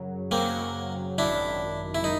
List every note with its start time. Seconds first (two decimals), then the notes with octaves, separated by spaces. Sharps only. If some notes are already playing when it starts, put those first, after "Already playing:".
Already playing: F#2 C#3 F#3
0.31 F#2 C#3 F#3 A#3 C4
1.18 G#1 F#2 D#3 D4 E4
1.95 E4
2.04 D#4